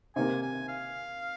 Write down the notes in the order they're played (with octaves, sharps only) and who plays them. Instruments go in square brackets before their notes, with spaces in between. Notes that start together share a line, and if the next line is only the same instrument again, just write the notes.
[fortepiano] C3 D#3 A#3 [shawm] G#5
[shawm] G#5
F5